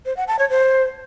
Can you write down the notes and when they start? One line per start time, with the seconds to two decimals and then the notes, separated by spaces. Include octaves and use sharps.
0.06 C5
0.17 F#5
0.28 A5
0.39 C#5
0.50 C5